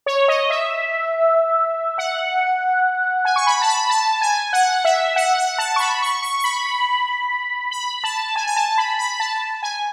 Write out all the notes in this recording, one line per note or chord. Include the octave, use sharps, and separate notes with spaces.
C#5
D#5
E5
F#5
G#5
C#6
B5
A5
B5
A5
G#5
F#5
E5
F#5
F#5
A5
C#6
B5
C#6
C#6
C#6
B5
B5
A5
G#5
G#5
A5
B5
B5
A5
G#5